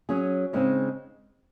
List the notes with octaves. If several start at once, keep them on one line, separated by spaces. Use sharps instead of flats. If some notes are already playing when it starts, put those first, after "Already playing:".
F#3 C#4 G#4
C#3 G#3 C4 D#4